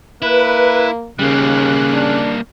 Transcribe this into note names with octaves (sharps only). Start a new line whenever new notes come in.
A#3 E4 B4
D#2 C#3 G3 A#3 F#6
D4